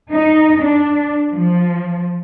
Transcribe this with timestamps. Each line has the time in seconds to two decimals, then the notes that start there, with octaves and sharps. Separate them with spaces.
0.11 D#4
0.59 D4
1.32 F3